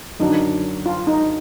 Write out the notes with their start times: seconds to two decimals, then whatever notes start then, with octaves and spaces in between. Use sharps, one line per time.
0.20 F#2 D3 F#3 D4 D#4
0.86 F4
1.07 D#4